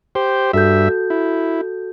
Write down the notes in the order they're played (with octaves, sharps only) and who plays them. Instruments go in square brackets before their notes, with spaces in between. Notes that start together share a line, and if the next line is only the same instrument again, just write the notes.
[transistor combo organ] G4 C5
[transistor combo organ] G2 E5 [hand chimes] F#4 A4 G6
[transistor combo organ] E4